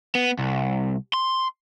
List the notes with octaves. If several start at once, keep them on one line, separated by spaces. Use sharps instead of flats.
B3
C2
C6